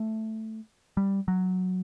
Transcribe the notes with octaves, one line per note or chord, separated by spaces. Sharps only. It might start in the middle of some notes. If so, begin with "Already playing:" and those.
Already playing: A3
G3
F#3